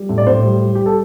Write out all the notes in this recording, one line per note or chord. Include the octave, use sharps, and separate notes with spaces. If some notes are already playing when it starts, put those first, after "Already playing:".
Already playing: G3
A2
D5
A2 C5
G3
G3
G3 G4
A4